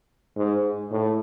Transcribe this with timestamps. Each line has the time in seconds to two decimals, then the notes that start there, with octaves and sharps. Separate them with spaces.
0.37 G#2
0.92 A2